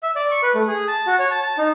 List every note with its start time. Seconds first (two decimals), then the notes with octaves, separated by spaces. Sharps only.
0.03 E5
0.16 D5
0.31 C#6
0.43 B4
0.55 A3
0.67 G#4
0.88 A5
1.07 F#4
1.19 C#5
1.31 A5
1.43 A5
1.58 D#4